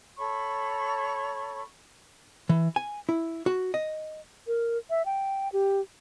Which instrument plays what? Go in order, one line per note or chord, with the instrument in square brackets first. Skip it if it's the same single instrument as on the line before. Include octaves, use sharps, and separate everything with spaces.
[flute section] A4 C#5 B5 C#6
[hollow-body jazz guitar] E3
G#5
E4
F#4
D#5
[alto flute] A#4
E5
G5
G4